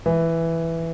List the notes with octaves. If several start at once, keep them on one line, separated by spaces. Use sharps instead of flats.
E3